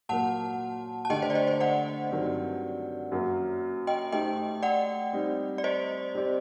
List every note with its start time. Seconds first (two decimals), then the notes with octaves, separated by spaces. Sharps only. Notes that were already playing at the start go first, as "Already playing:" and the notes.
0.09 A#2 F#3 A#3 F#5 A5
1.05 A5
1.10 D3 A3 D4 G4 D#5 G5
1.22 C5 D#5
1.30 D5
1.35 C5 D#5
1.47 C5 D#5
1.60 D5 F#5
2.11 G2 D#3 F#3 C4
3.12 F#2 F#3 A#3 F#4
3.87 D#5 G5
4.12 A3 D#4 G4 C5 D#5 G5
4.63 D5 F#5
5.13 G3 C4 D#4
5.58 D5
5.64 C5 D#5
6.14 G3 C4 G4 D5